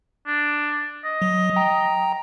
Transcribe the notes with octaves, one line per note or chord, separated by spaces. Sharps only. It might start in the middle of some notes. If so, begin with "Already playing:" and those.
D4
D#5
F#3
G5 A#5